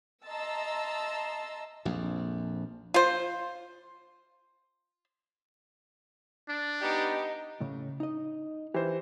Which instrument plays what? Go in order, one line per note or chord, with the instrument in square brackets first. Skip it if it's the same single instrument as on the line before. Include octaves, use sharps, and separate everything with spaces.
[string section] D#5 E5 A5 A#5 C6 E6
[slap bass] A#1 F2
[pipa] F4 C5
[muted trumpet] D4
[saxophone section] B3 G4 [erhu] D#4
[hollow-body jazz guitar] A2 C#3
D#4 D#5
[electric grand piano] E3 C5 [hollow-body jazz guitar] G4